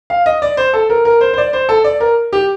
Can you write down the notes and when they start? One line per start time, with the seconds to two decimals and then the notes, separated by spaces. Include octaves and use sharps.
0.10 F5
0.26 D#5
0.42 D5
0.57 C5
0.73 A4
0.90 A#4
1.05 A#4
1.21 C5
1.33 C5
1.38 D5
1.53 C5
1.69 A4
1.84 D5
2.00 A#4
2.33 G4